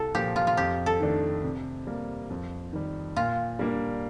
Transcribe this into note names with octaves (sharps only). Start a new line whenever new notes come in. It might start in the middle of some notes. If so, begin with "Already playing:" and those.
Already playing: C2 A4
A#2 F3 G4
F4
F4
F2 G4
A4
D#3 A3 D4
C3
G3 A#3
F2
D#3 G3
A#2 F4
G3 A#3 D4